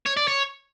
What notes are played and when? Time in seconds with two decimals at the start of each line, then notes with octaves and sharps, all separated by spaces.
0.06 C#5
0.17 D5
0.28 C#5